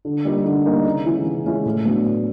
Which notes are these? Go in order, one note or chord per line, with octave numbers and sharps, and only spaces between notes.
D3
G3 A#3 D#4
D3
G3 A#3 D#4
C#3
E3 G#3 C#4 E4
C#3
E3 G#3 C#4 E4
A2
F#3 B3 D4
A2